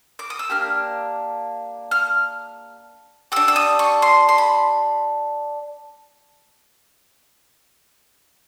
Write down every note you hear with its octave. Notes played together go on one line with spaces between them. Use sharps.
D6
D#6
E6
A#3 D4 G4 F6
F6
D4 G4 E6
E6
D#6
C#6
C6
C6
B5